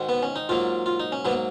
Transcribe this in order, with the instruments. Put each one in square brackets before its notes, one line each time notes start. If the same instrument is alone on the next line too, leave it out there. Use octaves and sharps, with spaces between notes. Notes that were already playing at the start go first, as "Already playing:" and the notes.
Already playing: [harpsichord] G#2 D#3 G#3 F#4
B3
C#4
D#4
G#2 F#3 A#3 F4
F4
D#4
C#4
G#2 F#3 A#3 B3